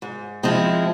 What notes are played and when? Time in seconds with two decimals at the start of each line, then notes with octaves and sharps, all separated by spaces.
0.02 G#2
0.43 F3 G#3 C4 E4